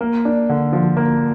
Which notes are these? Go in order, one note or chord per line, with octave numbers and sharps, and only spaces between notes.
A#3
D4
D3
F3
A#3